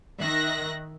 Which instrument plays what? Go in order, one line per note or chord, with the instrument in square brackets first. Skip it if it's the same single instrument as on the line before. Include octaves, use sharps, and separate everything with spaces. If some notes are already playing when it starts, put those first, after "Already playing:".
[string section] D#3 E5 F#6 A#6